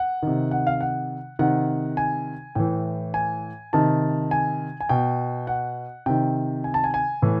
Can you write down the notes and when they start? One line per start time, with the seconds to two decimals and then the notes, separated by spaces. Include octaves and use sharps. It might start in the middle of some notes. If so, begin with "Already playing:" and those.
Already playing: F#5
0.23 C3 D#3
0.51 F#5
0.67 F5
0.81 F#5
1.39 C3 D#3 F#5
1.97 G#5
2.55 A2 E3 G5
3.14 G#5
3.73 C3 D#3 A5
4.31 G#5
4.80 G#5
4.89 B2 G5
5.47 F#5
6.06 C3 D#3 G5
6.64 G#5
6.74 A5
6.84 G#5
6.94 G#5
7.22 A2 E3